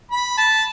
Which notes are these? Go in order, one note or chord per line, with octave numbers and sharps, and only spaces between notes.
B5
A5